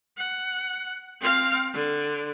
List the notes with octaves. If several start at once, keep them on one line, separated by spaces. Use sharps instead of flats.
F#5
C4 F5
D3